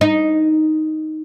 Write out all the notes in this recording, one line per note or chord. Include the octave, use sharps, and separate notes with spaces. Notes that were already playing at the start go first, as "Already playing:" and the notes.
D#4